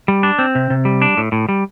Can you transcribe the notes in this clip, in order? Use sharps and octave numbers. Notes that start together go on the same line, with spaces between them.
G3
D4
C4
C3
C3
G3
D4
A2
A2
G3